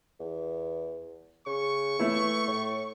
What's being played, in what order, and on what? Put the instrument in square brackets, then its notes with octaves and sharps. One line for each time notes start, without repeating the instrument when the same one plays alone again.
[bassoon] E2
[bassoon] C#3 [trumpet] C#6
[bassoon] E3 [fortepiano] A3 E4
[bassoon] A2